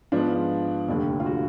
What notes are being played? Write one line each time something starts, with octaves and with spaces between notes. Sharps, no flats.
G#2 F3 B3 D4 F4
F1 D#2 D3
F4
F#4